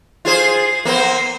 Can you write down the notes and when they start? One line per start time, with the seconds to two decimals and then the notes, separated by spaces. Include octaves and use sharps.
0.25 F4 G#4 C5
0.85 A#3 B3 C5